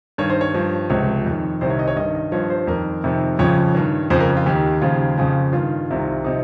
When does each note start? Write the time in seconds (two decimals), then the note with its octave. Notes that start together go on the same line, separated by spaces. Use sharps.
0.18 G2 D#3 C#5
0.30 C5
0.41 C#5
0.54 G2 F3
0.90 C#2 C3 F3 C#5
1.26 F2 D#3
1.61 C2 C3 D#3 C5
1.70 C#5
1.79 D#5
1.88 C#5
1.96 G2 D#3 D#5
2.15 D#5
2.32 G2 F3 C#5
2.50 C5
2.67 F2 D#3 A#4
3.04 F2 C3 D#3
3.39 F2 C#3 F3 C#5
3.75 G2 D#3
4.10 F2 C#3 F3 C5
4.20 A#4
4.37 F4
4.46 D#2 D#3 G4
4.82 D#2 C#3 F3 F4
5.18 F2 C#3 F3
5.53 G2 D#3 F4
5.88 C2 C3 D#3
6.24 C3 F3 D#4